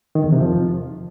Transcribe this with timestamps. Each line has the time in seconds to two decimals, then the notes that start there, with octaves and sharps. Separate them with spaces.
0.15 D#3
0.24 E2
0.32 C3
0.41 F3